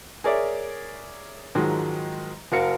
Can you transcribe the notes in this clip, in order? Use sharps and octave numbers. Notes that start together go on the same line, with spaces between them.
G#4 A#4 C#5 D5 E5
G#2 D#3 F3 F#3 G#3
F#1 F#4 A#4 F5 C#7